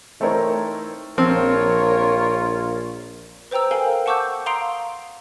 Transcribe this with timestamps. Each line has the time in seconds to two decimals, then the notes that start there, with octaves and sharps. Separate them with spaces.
0.20 E3 A3 C4 D#4 A#4 C#5
1.18 A#1 F3 C4 F4 A#4 C#5
3.51 B4 C5 G5 A#5 E6
3.71 A4 A#4 C5 F5 G5 G#5
4.06 F#5 A5 C#6 D6 E6 G6
4.46 F5 A#5 C6 D#6 C7 D7